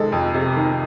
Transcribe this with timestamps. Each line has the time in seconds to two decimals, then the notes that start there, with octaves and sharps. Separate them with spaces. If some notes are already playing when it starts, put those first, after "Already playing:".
Already playing: C3 D#3 G#3 A4
0.12 F2
0.35 C3
0.57 D#3